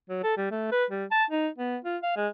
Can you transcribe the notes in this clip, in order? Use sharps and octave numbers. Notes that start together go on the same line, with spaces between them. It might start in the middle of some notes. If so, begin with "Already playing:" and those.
F#3
A4
G3
A3
B4
G3
A5
D#4
B3
F4
F5
G#3